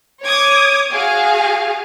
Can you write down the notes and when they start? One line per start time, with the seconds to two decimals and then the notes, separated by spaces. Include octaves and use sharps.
0.24 C#5 D6 D#6 G#6
0.93 F#4 G#4 F5